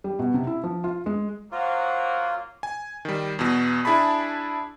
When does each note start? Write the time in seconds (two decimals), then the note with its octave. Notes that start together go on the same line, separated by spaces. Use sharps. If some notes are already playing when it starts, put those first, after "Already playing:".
0.04 G3
0.19 B2
0.34 C3
0.47 E4
0.63 F3
0.84 F4
1.06 G#3
1.52 F#3 A#3 F4 C5 F#5
2.63 G#5
3.05 D#3 G3
3.39 E2 B2
3.85 D4 E4 G#4 A5 B5